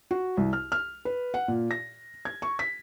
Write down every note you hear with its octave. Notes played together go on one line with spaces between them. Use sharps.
F#4
C2
F6
F6
B4
F#5
A#2
A#6
G#6
C#6
B6